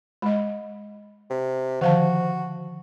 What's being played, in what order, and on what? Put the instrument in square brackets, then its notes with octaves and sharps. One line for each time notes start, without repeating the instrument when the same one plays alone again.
[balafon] G#3 D#5 [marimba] B5
[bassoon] C3
[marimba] D3 D#3 F3 [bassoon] F#4 [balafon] C5 F5 A5